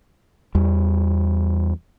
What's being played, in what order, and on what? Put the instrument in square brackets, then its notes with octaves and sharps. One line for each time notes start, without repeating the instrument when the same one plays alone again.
[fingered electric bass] E2 G3